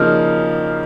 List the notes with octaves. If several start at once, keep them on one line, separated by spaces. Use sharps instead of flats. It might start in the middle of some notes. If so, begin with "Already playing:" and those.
Already playing: C#3 F3 A#3 D#4 F6